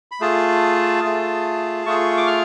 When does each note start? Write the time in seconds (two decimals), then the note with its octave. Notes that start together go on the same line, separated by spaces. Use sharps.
0.12 B5
0.20 A3 F4 G#4 A5
1.04 A3 F4 G#4
1.86 A3 F4 G#4 C#6
2.17 D6
2.27 F6